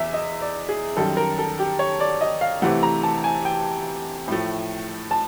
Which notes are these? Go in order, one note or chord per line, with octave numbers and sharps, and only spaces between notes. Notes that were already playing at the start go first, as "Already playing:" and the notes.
Already playing: E2 E5
D#5
D5
G#4
F#2 D#3 G3 A4
A#4
A4
G4
C#5
D5
D#5
F5
C3 E3 A3 F#5
A#5
A5
G#5
G5
A2 F3 A3
A5